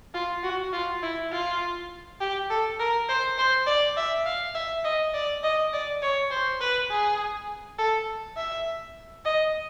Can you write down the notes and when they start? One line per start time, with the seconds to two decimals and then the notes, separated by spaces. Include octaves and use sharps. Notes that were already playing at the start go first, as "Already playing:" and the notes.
0.14 F4
0.43 F#4
0.73 F4
1.03 E4
1.33 F4
2.21 G4
2.50 A4
2.79 A#4
3.09 C5
3.38 C5
3.66 D5
3.97 E5
4.26 F5
4.55 E5
4.84 D#5
5.14 D5
5.43 D#5
5.73 D5
6.02 C#5
6.31 C5
6.61 B4
6.90 G#4
7.78 A4
8.37 E5
9.25 D#5